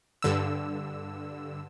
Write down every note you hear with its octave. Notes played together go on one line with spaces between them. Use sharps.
G2 D3 E6